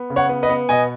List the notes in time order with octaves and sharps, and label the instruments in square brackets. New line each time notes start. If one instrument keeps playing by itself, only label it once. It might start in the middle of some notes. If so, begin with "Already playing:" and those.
Already playing: [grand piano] B3
C#3
C#5 F#5
B3
B4 D#5
B3
B2 D#5 G#5